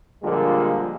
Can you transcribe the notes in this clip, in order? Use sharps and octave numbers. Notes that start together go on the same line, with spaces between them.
A#2 D3 F3 G3 G#3 A#3